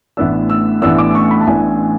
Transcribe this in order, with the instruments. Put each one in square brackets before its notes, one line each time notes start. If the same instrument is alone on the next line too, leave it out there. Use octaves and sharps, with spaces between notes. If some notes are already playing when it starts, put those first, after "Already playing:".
[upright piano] A1 A2 E3 B3 D4 E6
E6
A1 A2 E3 B3 D4 E6
D6
C#6
B5
A5
A1 A2 E3 B3 D4 G#5